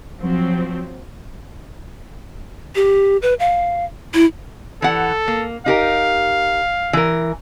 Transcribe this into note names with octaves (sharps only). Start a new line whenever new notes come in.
F3 F#3 C4
G4
B4
F5
E4
E3 A4 F#5
A#3
D#4 G4 A#4 F5
E3 A#4